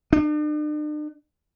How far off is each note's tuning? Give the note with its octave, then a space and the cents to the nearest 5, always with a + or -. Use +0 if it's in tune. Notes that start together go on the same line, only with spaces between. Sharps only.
D4 +45